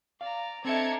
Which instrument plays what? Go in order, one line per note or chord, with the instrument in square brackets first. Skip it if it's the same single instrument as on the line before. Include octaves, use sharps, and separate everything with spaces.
[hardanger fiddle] D5 A#5 [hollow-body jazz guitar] F5
[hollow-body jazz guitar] C4 E5 [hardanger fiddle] D4 D#4 [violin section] A4 G#6 C#7